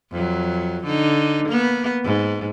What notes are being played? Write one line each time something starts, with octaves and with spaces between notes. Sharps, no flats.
F2 F#3
D3 D#4
A#3 B3
G#2